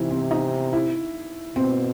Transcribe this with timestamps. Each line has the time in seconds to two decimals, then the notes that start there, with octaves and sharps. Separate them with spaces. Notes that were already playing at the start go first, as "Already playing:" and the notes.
Already playing: C3 E3 D#4 E4
0.11 C4
0.31 D#4
0.73 E4
1.56 B2 C4